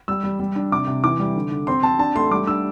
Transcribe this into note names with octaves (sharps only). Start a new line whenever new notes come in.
G3 E6
G3
G3
D4
C3 D6
C3
E3 D6
G3
D3
D3
C4 C6
C4 A5
D4 A5
A3 C6
G3 D6
D4 E6